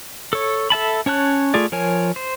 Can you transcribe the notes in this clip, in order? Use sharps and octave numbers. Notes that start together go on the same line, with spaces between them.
A4 C#5
A4 E5 A5 B5
C#4 C#5 A5 F#6
A3 F4 G#4 D5
F3 A#4 C#5 G#5
C5